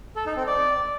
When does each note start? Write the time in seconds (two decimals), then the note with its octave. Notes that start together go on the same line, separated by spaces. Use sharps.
0.16 A4
0.26 D#4
0.36 C4
0.47 D5